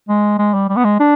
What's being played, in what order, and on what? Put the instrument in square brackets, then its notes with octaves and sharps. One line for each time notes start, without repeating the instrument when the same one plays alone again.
[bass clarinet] G#3
G#3
G3
G3
B3
G#3
D4